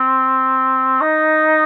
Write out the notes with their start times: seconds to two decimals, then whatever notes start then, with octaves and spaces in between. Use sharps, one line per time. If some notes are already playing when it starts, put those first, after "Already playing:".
Already playing: C4
1.01 D#4